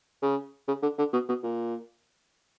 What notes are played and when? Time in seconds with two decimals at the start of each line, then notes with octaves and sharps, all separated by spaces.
0.22 C#3
0.68 C#3
0.83 D3
0.98 D3
1.13 B2
1.28 B2
1.43 A#2